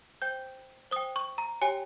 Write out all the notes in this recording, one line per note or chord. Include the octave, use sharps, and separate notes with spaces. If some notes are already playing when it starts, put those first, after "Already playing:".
C5 G5 G6
C5 G5 D#6
C#6
A#5
G4 C#5 G5 G#5